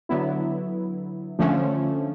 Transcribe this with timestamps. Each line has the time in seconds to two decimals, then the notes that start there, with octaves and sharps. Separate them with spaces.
0.09 D3 F#3 B3 E4
1.39 D3 F3 A3 C#4